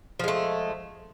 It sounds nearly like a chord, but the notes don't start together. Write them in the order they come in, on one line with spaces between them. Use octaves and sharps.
F3 G#3 A3